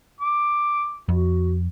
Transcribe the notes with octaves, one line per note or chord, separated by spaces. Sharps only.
D6
F2 F#4